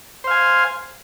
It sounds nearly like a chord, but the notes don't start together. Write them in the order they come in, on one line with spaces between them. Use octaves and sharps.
C5 F5 G#5